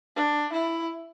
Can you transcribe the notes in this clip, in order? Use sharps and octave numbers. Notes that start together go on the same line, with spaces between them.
D4
E4